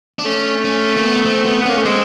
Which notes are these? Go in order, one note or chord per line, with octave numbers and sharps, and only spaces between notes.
D4
A3 C#4
C#4
A#3
B3
C4
B3
B3
A#3 C#4
A3
G#3 C4